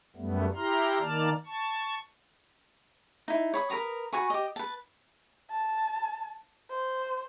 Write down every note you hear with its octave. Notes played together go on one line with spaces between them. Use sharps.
F#2 G3 A3 B3
E4 G4 A#5 C6 F6
D#3 A#3 D5 A5 F6
A5 C#6
D#4 E4
C#5 B5 D#6
A#4 B4 A#5 D#6
F#4 B4 G#5 C#6
G4 D#5
B4 A5
A5
C5